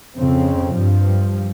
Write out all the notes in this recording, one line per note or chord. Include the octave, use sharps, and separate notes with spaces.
F2 C#3 C4
G2 F3